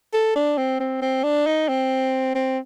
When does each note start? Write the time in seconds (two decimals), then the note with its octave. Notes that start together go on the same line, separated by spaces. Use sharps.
0.14 A4
0.36 D4
0.58 C4
0.80 C4
1.02 C4
1.24 D4
1.47 D#4
1.69 C4
2.35 C4